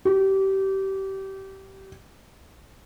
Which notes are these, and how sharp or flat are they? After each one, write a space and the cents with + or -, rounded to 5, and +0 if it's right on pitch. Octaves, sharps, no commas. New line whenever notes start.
G4 -25